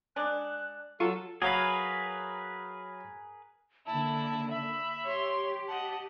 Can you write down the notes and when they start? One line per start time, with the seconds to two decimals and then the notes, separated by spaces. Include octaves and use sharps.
0.16 G#3 D4 F#6
1.00 F#3 F4 A4 A#5 C#6 D#7
1.42 F#3 G#4 A#4 B4 F5 B5
3.86 D3 A#3 E4 A5
4.50 E5 B5
5.05 G4 C#5 C6
5.68 D#5 F#5 A5